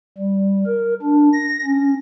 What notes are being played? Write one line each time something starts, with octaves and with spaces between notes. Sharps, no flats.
G3
A#4
D4
A#6
C#4